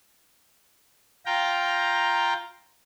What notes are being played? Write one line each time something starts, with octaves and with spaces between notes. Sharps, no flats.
F4 G5 A#5